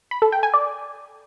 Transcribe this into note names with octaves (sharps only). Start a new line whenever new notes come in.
B5
A4
G5
G#5
D5